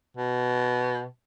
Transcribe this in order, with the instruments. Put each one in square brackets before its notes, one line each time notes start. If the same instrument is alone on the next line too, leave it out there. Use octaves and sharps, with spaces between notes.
[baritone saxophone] B2